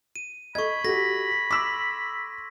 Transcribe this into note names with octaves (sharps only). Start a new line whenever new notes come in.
D#7
A4 D#5 B5 C#6 G#6
F#4 G4 A4 A#6 B6
C6 D6 E6 B6